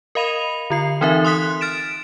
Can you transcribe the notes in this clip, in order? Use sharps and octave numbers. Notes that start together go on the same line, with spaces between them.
A#4 D#5 F5 B5 D#7 F7
D3 F4 C7
E3 C4 D#4 A#4 E5
C6 D#6 F#6 B6
F6 A6 D7 E7